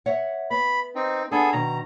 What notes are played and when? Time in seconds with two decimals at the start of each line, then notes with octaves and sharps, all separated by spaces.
0.06 C#5 E5 F#5
0.50 B3 B5
0.96 C4 D#4
1.32 B3 D4 G#4 A4
1.53 B2 D#3 A#5